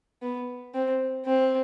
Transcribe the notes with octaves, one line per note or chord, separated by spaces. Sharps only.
B3
C4
C4